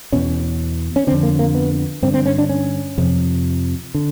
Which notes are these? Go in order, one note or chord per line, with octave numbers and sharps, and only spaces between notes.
E2 B2 C#4
C#4
F2 D3 C4
A#3
A#3
B3
G2 D3 C4
C4
C#4
D4
C#4
F2 C3
D3